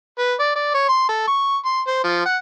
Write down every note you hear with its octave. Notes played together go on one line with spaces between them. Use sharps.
B4
D5
D5
C#5
C6
A4
C#6
C6
C5
F3
F#5